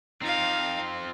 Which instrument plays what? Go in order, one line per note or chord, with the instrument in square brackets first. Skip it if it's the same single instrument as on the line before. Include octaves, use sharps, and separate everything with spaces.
[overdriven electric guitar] C4 F4 [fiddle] D#4 F5